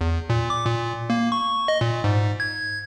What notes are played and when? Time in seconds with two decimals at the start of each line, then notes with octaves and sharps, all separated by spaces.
0.01 E2
0.30 A#2
0.50 D6
0.66 A#2
1.10 A#3
1.32 C#6
1.68 D#5
1.81 A#2
2.04 G#2
2.40 G#6